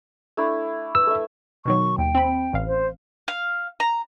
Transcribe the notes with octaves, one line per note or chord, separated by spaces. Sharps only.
A3 D4 E4
B4 E6
A3 E5
B2 D#3 F#3 C#6
D#2 G5
C4 B5
A1 F5
C5
F5
A#5